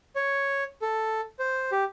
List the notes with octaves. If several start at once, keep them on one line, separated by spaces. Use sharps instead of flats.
C#5
A4
C5
G4